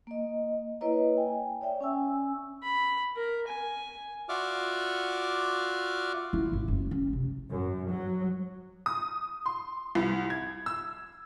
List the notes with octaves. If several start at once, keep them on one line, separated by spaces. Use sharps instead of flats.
A#3 D#5
A#3 E4 B4 C#5 D#5 A#5
G5 G#5
C#5 D5 E5 G5
C#4 G#5 E6
B5
A#4
G#5
F4 F#4 D5 E5 D6 F6
E4
G#1
F#1
C#4
C3
F#2
F#3
D#6
C6
C2
G#6
E6